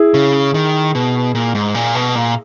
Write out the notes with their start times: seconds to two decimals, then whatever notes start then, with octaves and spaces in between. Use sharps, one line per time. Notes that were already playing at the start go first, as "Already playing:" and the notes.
Already playing: E4 G#4
0.14 C#3
0.54 D#3
0.95 B2
1.35 A#2
1.55 G#2
1.75 A#2
1.95 B2
2.15 A#2